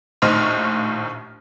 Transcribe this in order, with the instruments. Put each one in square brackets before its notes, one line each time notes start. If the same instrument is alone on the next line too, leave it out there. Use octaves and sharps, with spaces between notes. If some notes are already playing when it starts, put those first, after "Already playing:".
[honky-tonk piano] A#1 D#2 A2 D#4 C5 F6